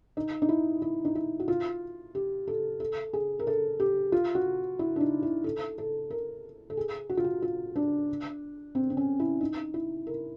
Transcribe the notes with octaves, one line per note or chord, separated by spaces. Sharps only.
D#4
D#4
E4
E4
D#4
E4
F#4
F4
G4
A4
A4
G#4
A#4
A4
G4
F4
F#4
E4
D4
D#4
E4
A4
A4
A#4
A4
G#4
F#4
F4
F#4
F4
D4
C4
C4
C#4
E4
D#4
E4
A#4